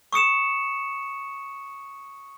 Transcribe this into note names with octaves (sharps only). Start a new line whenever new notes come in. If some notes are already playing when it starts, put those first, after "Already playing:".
C#6 D#6 C#7 E7